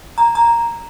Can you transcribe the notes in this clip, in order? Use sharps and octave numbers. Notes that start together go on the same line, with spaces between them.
A#5
A#5